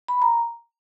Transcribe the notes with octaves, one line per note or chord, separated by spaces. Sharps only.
B5
A#5